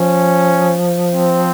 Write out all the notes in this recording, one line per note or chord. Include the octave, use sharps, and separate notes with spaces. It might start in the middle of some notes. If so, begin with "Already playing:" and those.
Already playing: F3 C#4
C4